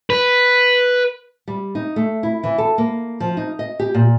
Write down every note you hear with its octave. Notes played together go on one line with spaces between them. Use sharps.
B4
G3
D#4
A3
E4
E3
A4
A#3
F3
D#4
D#5
G4
A#2